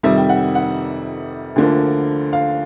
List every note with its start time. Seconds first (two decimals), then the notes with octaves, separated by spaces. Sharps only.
0.03 F2 C3 D#3 G3 E5
0.18 G5
0.29 F#5
0.55 F#5
1.56 D2 D3 F3 A#3
2.33 F5